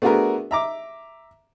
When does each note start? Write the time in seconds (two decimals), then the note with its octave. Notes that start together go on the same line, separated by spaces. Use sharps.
0.02 A3 B3 D4 F#4 G#4 A#4
0.51 E5 A#5 D6